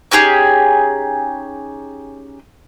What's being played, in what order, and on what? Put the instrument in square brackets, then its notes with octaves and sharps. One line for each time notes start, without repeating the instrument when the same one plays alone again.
[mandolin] C#4 D#4 G4 G#4